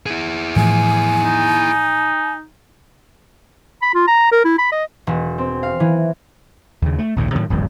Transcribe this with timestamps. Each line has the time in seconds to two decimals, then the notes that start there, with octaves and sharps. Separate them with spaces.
0.06 E4 G#4
0.56 A2 E3 F3 G#5
1.23 D#4
3.82 B5
3.95 F4
4.08 A#5
4.32 A#4
4.45 E4
4.58 B5
4.72 D#5
5.07 E1
5.38 C4
5.63 F5
5.80 E3
6.82 D#2 C#3
6.99 A3
7.16 A#1 D#2 G#2 C3
7.33 A2 C3 D#3 F#3
7.50 D1 G#1 F2 G3